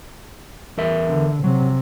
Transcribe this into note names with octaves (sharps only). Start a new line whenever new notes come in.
E2 A#4 E5
D3
C3 F#3